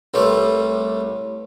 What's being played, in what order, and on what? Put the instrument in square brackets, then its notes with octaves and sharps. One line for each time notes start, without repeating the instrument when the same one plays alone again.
[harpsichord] C2 G3 A3 [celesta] B4 C#5 C6